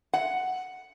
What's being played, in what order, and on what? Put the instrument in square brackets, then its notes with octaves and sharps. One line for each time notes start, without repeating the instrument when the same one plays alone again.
[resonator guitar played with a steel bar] F#5